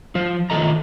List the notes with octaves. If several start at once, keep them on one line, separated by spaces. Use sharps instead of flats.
F3 F4
D#3 A3 F4 A4 D#5 A#5